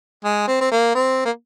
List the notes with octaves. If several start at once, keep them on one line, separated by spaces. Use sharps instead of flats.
G#3
C4
C4
A#3
C4
A#3